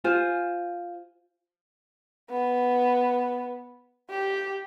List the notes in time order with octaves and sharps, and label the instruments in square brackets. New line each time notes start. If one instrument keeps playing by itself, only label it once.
[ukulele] F4 C5 G#5
[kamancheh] B3
G4